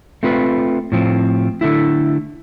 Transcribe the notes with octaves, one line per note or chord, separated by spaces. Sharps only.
A3 C4 F4 B4
A2 F3 C4
D3 A3 E4